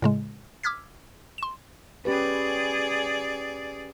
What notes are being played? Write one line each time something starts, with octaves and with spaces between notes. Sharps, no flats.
A2 C#3 G#3
D6 E6 F6 G#6 B6
C6 E7
C#4 G4 G#4 B4 D5